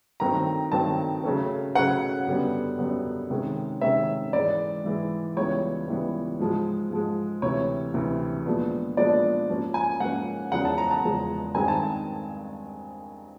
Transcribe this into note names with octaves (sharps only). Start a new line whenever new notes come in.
G2 D#3 F#3 A3 C4 A#5
G2 D#3 F#3 A3 C4 A5
C#3 F#3 A3 C#4
C#3 F#3 A3 C#4 F#5
F#2 D3 G3 B3
F#2 D3 G3 B3
C3 D#3 G#3 C#4
C3 D#3 G#3 C#4 E5
G#2 E3 G#3 D5
G#2 E3 G#3
C#2 C#3 E3 G3 B3 C#5
C#2 C#3 E3 G3 B3
G#2 F3 G#3
G#2 F3 G#3
D2 C3 E3 C#5
D2 C3 E3
A#2 F3 G#3 B3 D4
A#2 F3 G#3 B3 D4 D5
G#2 F3 A#3 C#4
G#5
G#2 F3 A#3 C#4 F#5
E2 C#3 F3 G#3 C#4 F#5
A5
A#5
A5
E2 C#3 F3 G#3 C#4
G2 D#3 G#3 C4 G#5
A5